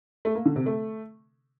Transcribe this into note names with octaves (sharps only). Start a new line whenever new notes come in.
A3
A#3
D3
C3
A3